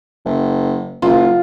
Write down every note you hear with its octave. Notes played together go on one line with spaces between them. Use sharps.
F#1
F#1 F4